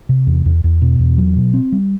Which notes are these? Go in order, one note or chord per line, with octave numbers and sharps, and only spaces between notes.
C3
E2
E2
E2
B2
E2
F#3
B2
C4
G3